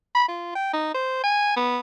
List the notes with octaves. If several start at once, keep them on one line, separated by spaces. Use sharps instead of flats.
B5
F4
G5
D#4
C5
G#5
B3